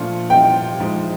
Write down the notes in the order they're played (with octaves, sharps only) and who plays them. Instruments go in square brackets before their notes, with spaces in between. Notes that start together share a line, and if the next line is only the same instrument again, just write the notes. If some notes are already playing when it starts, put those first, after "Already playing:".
Already playing: [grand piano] A#2 F3 A3 D4 F4
[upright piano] G5
[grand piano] G#2 F3 G#3